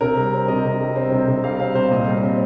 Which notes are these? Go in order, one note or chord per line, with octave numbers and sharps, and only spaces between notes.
C3 A#4
G3
C4
C3 D#5
C3
G3
C4
C3
C3
G3 F5
C4 F5
C3 C5
A#2 D#5
G3
C4